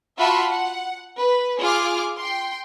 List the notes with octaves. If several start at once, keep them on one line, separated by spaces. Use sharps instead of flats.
F4 F#4 E5 A5 B5 C6
F#5
B4
F4 G#4 D6 F6
G5 C6